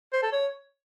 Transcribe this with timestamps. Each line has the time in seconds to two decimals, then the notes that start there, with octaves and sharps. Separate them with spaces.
0.13 C5
0.23 A4
0.32 C#5